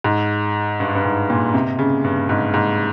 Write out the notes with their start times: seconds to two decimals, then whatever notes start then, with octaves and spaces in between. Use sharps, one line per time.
0.04 G#2
0.80 G2
0.95 G2
1.05 G#2
1.30 A#2
1.54 C3
1.79 C#3
2.04 G2
2.29 G#2
2.54 G#2